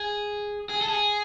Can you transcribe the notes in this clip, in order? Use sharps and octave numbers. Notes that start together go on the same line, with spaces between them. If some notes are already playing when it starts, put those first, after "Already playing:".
Already playing: G#4
G#4
A4
G#4